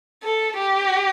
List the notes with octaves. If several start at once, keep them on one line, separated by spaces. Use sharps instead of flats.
A4
G4